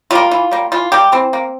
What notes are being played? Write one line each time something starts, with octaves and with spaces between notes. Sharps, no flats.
G3 A#3 F4
E3
G3 A#3
E3 F4
G3 A#3 G4
E3 C4
A#3